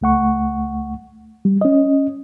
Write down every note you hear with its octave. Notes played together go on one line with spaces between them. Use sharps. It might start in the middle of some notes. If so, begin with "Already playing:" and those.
C#2 A3 F#5 C#6
G3
C#4 D#5